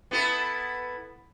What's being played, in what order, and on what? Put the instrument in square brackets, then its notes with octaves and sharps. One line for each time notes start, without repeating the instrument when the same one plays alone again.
[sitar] B3 E4 A4